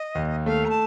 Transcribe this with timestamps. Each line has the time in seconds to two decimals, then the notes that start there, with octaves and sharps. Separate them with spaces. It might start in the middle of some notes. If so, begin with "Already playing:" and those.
Already playing: D#5
0.15 D#2
0.46 A3 F5
0.65 A#5
0.70 A5